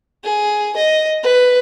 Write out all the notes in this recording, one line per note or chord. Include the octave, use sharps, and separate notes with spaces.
G#4
D#5
B4